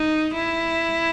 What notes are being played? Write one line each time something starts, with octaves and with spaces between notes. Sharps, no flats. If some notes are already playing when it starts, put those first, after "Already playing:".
Already playing: D#4
E4